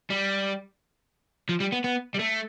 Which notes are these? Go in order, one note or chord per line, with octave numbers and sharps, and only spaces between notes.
G3
F3
G3
B3
B3
G3
A3